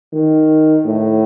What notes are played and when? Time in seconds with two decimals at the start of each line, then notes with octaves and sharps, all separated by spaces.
0.13 D#3
0.85 A2